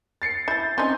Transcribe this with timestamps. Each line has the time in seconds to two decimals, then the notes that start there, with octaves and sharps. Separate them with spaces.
0.22 A6 C7 C#7
0.48 E4 G6 A6
0.78 C4 C#4 D#4 C6 G6